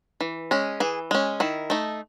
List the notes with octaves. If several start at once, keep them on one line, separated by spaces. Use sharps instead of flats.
E3
G#3 C#4
E3 G#4
G#3 C#4
D#3 E4
A3 D#4